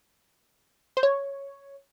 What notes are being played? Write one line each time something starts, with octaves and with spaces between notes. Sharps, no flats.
C5
C#5